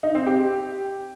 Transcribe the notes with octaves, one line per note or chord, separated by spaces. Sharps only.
D#4
C4
G4